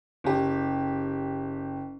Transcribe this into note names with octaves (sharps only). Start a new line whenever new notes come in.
F#1 G4